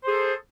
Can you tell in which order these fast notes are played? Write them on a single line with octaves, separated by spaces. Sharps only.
C5 G#4 A4